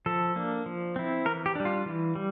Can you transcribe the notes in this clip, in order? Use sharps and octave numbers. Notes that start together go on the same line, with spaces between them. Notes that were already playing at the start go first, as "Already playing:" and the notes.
F3 A4
A#3 D4
F3
C4 E4
E3 A#4
G4
G3 D4
F4
E3
G3